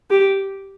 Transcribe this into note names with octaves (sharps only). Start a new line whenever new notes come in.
G4